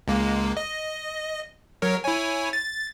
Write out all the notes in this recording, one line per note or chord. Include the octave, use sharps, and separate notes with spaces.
C#2 G#3 A#3
D#5
F#3 A#4 C#5
E4 C#5 G#5
A6